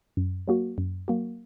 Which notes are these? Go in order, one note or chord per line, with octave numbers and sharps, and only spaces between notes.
F#2
F#3 A#3 F#4
F#2
F#3 A#3 F#4